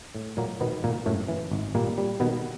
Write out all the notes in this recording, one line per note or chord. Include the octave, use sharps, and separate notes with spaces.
A2
A#2 F#3 A#3
B2 D#3 B3
G#1 A#2 A#3
F#2 A2 A3
E3
G#1
A#2 G3 A#3
G3
B2 D#3 B3